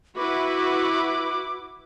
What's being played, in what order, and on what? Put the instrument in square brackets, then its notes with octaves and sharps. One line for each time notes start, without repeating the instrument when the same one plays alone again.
[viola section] E4 F#4 B4 [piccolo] D6